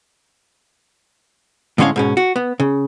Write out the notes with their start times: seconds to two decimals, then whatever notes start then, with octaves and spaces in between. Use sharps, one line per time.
1.78 A2 D3 G#3 C#4 C#5 F5
1.96 G#2 B2 C#4
2.17 F#4
2.36 B3
2.60 C#3